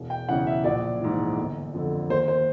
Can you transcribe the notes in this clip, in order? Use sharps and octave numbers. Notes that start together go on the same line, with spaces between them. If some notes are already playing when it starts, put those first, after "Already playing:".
Already playing: E1
G5
E2 C#3 E3 F#5
E5
A#1 D5
G#2 E3
G1
F2 D3
D#2 C5
C5